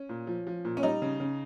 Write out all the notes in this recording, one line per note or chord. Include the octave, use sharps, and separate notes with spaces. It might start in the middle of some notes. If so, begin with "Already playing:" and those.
Already playing: C#4
A#2
F3
F3
A#2
C#4
G3 D#4
C#3
C#3